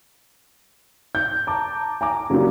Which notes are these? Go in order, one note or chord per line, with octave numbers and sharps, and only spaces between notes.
G6
A5 A#5 D6
G#5 A#5 D6
C#3 F#3 G3 A#3 D4